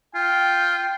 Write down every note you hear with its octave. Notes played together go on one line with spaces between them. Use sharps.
F4 G5